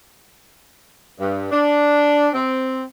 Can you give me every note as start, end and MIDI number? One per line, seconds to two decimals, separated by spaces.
1.19 1.49 43
1.51 2.29 62
2.33 2.82 60